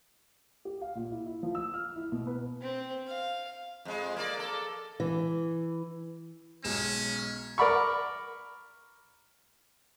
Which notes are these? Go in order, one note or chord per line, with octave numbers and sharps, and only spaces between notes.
G4
F5
A#2
E4
E4
F3
E6
F6
E4
B2
B4
C4
F5
F2 G#3
A#3 D5
A4
E3
B1 G#3 C#4 E7
A#4 D5 B5 C#6